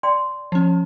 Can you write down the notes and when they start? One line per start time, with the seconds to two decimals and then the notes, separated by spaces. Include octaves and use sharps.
0.03 D5 G5 C6
0.52 F3 C#4